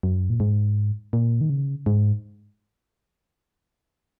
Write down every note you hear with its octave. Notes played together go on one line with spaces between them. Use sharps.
F#2
A#2
G#2
A#2
D#3
C#3
G#2